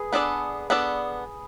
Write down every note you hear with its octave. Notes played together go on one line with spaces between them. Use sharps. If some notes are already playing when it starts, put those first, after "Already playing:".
Already playing: G#4 B4
B3 D4 A4 D5
B3 D4 A4 D5